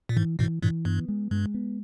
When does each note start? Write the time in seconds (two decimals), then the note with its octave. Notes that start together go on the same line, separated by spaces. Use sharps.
0.09 A#2
0.16 G#2 E3
0.39 G#2 B2 E3
0.62 G2 A#2 E3
0.85 G2 B3
1.08 G#3
1.31 G2 G#3
1.54 B3